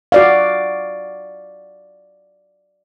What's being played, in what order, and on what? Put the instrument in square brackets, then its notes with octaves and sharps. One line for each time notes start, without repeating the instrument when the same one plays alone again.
[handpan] F#4 D5 F5